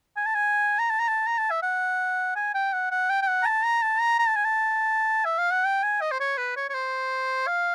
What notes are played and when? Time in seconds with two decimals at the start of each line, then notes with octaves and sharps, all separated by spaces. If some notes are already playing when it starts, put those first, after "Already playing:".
0.17 G#5
0.26 A5
0.35 G#5
0.79 A#5
0.90 A5
0.99 A#5
1.08 A5
1.27 A#5
1.38 A5
1.51 E5
1.62 F#5
2.36 G#5
2.54 G5
2.73 F#5
2.91 F#5
3.10 G5
3.22 G5
3.28 F#5
3.42 A#5
3.45 A5
3.64 A#5
3.82 A5
4.00 A#5
4.19 A#5
4.28 A5
4.36 G#5
4.44 A5
5.25 E5
5.39 F5
5.51 F#5
5.65 G5
5.83 G#5
6.01 D#5
6.12 C5
6.20 C#5
6.38 B4
6.56 C#5
6.69 C#5
6.75 C5
7.47 F5